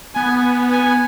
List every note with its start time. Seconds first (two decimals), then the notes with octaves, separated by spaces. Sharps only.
0.15 B3 G#5
0.71 G#5